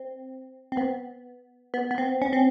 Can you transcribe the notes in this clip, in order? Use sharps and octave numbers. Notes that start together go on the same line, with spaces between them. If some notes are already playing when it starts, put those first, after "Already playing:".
Already playing: C4
C4
B3
B3
B3
C4
C#4
C4